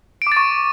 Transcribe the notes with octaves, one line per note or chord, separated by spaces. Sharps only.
C#6 D6 A6 D7